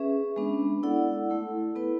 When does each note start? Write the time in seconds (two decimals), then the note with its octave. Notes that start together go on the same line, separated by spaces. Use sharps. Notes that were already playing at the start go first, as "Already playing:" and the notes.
Already playing: C#4 G#4 B4 E5
0.36 G#3 B3 D4
0.83 E4 A4 D5 F#5
1.30 A3 E4 A4
1.76 B3 E4 B4